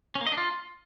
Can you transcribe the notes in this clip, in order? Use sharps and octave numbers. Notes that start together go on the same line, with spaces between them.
C#4
A#3
D#5
D4
F4